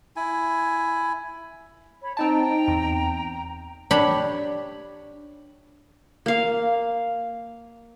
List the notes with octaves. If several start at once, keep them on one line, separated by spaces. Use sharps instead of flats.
E4 G#5
C#5 B5
C4 D#4 G5 A5 A#5
E2
D4 G4 C#5 B5
A#3 F5